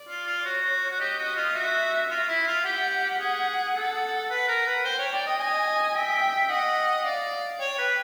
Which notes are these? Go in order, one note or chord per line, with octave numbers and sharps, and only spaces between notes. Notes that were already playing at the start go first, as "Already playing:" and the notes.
Already playing: D5
F4
F4
F#4 C#5
F#4
G4 D#5
F#4
F4
F#4 E5
F4 E5
E4
F4
G4 F#5
G#4
A4
B4 F#5
A#4
B4
C5 G5
C#5
D5
D#5
D#5 G#5
E5 G5
D#5 F#5
D5 F5
C#5 G5
B4